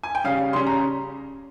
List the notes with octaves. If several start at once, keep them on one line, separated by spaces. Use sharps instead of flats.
G#5
G5
C#3 G3 C#4 F5
C#3 G3 C#4 C6
A#5